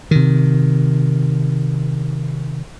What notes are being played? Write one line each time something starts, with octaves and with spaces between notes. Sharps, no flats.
C3 D#3